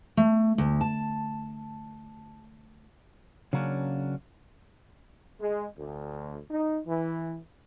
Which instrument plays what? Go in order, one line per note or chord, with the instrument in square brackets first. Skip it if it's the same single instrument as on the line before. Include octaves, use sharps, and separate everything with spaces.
[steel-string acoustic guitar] A3
D2
A5
[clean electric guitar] C#3 F#3 A#3 C#4 D4
[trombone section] G#3
D2
D#4
E3